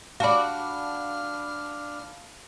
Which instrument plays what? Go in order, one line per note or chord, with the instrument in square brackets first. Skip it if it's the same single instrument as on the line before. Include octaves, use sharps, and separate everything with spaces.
[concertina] D4 F6 [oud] F#4 D5 [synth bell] F5 A5 B5